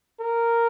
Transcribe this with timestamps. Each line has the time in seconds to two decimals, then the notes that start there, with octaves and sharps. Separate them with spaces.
0.20 A#4